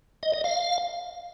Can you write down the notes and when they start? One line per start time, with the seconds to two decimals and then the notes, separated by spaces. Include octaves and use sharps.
0.23 D#5
0.34 D#5
0.44 F5